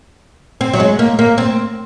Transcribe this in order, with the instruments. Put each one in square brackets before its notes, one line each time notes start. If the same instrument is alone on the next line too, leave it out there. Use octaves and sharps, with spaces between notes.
[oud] C4
F#3
G#3
A#3
A#3
C4